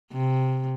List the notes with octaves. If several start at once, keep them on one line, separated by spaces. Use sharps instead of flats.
C3